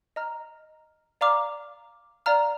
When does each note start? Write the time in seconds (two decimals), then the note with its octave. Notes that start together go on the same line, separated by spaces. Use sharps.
0.16 D#5 A#5 F6
1.21 D5 F5 A#5 D6 F6
2.26 D5 F5 A#5 F6